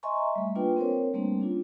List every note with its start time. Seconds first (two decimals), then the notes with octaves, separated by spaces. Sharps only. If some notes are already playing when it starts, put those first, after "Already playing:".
0.03 D#5 E5 G#5 A#5 C6 C#6
0.35 G3 A3
0.55 A#3 D4 F4 B4 G5
0.76 C4 A#4 C5 C#5
1.14 G3 A3 A#3 C4 D4
1.40 C#4 D4 F4